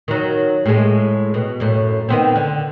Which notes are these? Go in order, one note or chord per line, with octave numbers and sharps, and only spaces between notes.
D#3 F#3
A2 G#3
B2
F#2 A2
D#3 B3 C4
D3